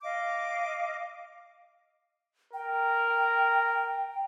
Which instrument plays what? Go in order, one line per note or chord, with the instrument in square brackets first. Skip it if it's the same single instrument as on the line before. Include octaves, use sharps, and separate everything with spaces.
[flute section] D#5 F5 D6
[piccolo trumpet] A#4 [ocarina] G5